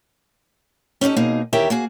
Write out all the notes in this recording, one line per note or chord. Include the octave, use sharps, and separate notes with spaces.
C#4 D#4 F#4 G4 A4
B2 A#3 D#4 G#4
E2 D#3 G4 A#4 C#5 E5
A#3 F#4 G#4